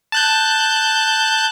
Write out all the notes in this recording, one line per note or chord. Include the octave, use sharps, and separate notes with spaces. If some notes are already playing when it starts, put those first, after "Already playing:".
A5 F#6 G6